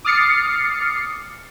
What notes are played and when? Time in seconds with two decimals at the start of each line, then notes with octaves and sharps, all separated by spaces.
0.05 D6 D#6 F6 A6 C7 C#7